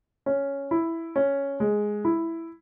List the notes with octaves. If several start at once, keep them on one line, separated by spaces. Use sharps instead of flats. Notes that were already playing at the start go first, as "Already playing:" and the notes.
C#4
E4
C#4
G#3
E4